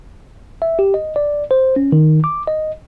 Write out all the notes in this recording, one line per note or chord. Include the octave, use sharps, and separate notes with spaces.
E5
G4
D#5
D5
C5
C#4
D#3
D6
D#5